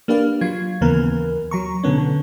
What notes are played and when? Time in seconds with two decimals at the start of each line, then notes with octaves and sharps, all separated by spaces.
0.08 A#3 D4 G4 B4 F5
0.41 F#3 F4 G#6
0.81 D#2 C#3 E3 A#3 B3 A#4
1.51 F#3 A#5 C#6
1.83 B2 D3 B3 C#4
1.98 D3